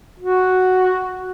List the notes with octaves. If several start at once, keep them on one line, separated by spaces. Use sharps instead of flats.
F#4